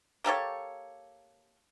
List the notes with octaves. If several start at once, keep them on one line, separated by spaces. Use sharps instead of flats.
A#3 G4 A4 C#5